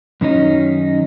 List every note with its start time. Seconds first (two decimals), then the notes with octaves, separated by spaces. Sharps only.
0.21 F#2 D#3 C#4 D#4